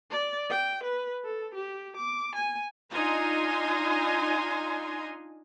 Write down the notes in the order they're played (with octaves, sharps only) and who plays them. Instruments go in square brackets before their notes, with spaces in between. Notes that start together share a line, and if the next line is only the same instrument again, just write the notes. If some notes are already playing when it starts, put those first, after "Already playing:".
[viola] D5
G5
B4
A4
G4
D6
G#5
[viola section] D4 D#4 F4 G#5 A#5 C6